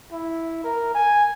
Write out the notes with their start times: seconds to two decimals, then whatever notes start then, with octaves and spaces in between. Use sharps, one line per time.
0.12 E4
0.64 A#4
0.95 G#5